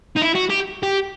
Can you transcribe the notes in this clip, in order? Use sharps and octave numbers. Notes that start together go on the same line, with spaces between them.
D#4
E4
F#4
G4
G4